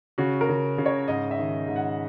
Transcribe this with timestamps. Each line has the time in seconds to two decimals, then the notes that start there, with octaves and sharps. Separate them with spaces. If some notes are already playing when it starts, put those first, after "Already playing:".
0.18 C#3 F#4
0.41 A#4
0.49 C#3
0.78 C#3
0.86 C#5
1.08 G#2 D#5
1.31 E5
1.38 D#3
1.68 G#2
1.76 F#5